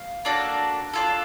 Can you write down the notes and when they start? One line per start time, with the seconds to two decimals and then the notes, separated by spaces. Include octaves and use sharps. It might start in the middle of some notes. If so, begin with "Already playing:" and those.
Already playing: F5
0.25 A#3 D4 F#4 A4
0.94 D4 F4 A4